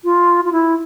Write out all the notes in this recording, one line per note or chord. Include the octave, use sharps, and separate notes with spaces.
F4
F4
E4